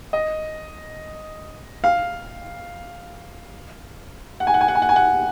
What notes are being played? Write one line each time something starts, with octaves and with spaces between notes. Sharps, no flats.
D#5
F5
F#5
G#5
F#5
G#5
F#5
G#5
F#5
G#5
F#5